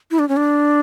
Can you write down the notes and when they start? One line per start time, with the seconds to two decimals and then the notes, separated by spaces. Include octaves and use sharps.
0.11 E4
0.19 D4
0.29 C#4
0.37 D4